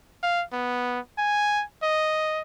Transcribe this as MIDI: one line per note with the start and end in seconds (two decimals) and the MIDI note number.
0.23 0.43 77
0.53 1.00 59
1.18 1.64 80
1.83 2.42 75